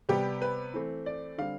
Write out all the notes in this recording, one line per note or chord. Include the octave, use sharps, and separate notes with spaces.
C3 G3 B3 G4
B4
E3 A3 C4
D5
D3 G3 C4 F5